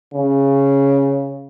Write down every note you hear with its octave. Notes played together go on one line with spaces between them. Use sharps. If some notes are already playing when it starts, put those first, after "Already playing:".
C#3